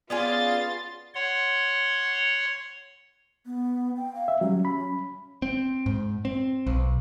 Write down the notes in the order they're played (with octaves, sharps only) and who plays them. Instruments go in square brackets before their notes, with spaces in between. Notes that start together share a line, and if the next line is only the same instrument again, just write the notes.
[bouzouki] B3 C#4 G#4 [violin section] F4 A6 [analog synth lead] D5
[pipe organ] C#5 F#5 C6
[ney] B3
G5
F5
[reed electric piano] E5
[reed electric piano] F#3 G3 [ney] C#4
[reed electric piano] B5
[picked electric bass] C4
G#2
C4
B1